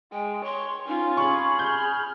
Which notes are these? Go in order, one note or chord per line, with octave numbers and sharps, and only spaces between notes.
G#3 G5
C#5 C6
C#4 D#4 F4
G#4 B5 C#6
F6 G6